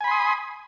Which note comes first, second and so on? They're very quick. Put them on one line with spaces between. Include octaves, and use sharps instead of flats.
G#5 B5 C6 D#6